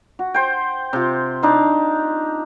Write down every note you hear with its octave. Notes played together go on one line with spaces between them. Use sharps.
F#4
C5 G5
C3 F4
D4 D#4 F5